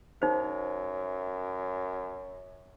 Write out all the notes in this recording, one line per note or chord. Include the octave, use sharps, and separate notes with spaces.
F#2 D#4 C5